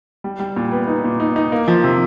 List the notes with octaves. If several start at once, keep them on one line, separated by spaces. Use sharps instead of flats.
G3
G3
A#2
B3
D#4
A#2
D#4
D#4
A#3
F3
C3